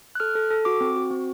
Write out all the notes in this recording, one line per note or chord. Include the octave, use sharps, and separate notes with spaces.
F#6
A4 F6
A4
A4
F#4 D6
C4
F#4
C4